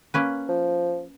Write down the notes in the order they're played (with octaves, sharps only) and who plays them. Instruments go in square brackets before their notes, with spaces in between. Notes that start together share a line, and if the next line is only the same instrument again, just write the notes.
[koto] A#3 C#4 B4
[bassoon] F3